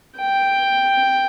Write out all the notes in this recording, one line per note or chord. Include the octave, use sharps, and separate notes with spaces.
G5